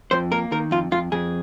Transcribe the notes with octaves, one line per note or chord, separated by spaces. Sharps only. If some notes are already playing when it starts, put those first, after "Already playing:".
F2 C5
A#3 A#4
D#3 A#4
F2 F4
F2 F4
F2 G#4